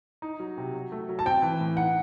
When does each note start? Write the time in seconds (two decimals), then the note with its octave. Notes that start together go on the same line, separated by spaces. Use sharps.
0.22 D#4
0.40 F#3
0.58 C3
0.74 F#3
0.92 A3
1.09 F#3
1.19 A5
1.25 C4 G5
1.42 E3
1.60 A2
1.77 D#4 F#5